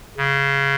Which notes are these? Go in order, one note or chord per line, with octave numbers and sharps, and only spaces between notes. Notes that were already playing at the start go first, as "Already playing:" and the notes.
C#3